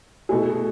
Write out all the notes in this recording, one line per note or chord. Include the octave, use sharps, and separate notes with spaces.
B2 A3 E4 G#4